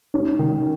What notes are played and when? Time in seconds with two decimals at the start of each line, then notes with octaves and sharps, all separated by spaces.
0.14 C#4
0.39 D#3